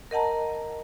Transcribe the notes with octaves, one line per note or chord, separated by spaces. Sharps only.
A#4 D#5 F#5 A5 A#5